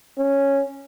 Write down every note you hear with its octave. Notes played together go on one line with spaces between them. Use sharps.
C#4